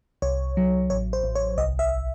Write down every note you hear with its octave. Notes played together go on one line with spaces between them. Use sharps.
C2 C#5
F#3
A1 C#5
C5
A1
C#5
C2 D#5
E5